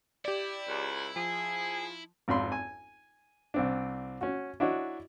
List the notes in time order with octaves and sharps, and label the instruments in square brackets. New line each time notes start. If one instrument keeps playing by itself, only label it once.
[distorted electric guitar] E4 [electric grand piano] G4 D5
[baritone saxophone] C#2
[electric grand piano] F3 [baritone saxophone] G#4
[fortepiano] G#1 F2 B5 C6
G#5
C2 C4 D4
C#4 F#4
D4 E4 F#4 C#5 D#5